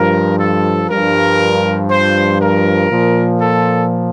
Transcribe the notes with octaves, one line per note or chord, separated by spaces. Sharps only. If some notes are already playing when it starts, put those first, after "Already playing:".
Already playing: G2 F3 A#4
A4
G2 F3 A#4
C5
A#4
A#2 F3
A4